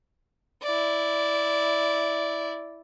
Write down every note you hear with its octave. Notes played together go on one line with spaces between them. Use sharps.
E4 D5